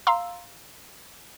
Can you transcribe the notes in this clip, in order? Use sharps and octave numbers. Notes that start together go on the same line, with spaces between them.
F5 A#5 C6 E6